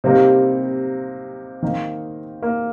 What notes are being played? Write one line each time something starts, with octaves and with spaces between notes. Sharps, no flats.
C3 G3 A#3 C4 D#4
D#3 A#3 D#4
A#3